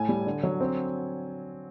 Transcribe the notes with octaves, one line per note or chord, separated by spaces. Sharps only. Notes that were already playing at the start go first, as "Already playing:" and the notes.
Already playing: A2 G#5
G3
D3
F#3
C4